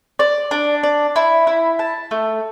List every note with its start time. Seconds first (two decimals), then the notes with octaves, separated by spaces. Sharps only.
0.19 D5
0.51 D4
0.83 D5
1.16 E4
1.47 E4
1.79 A5
2.11 A3